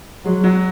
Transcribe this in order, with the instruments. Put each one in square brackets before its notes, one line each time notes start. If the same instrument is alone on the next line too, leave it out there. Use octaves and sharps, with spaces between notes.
[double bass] F#3 [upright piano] G#3
[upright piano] F#3